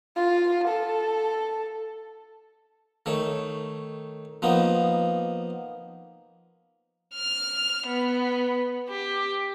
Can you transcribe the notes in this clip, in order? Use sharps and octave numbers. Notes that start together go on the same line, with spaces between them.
F4
A4
D#3 A3 C#5
F3 A#3 B3 D#4
F6
B3
G4